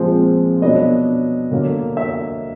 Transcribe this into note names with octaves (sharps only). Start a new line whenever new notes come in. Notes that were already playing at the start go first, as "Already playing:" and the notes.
Already playing: A#2 F3 G#3 C4
B2 F#3 B3 D4 D#5
D3 F#3 A#3
E5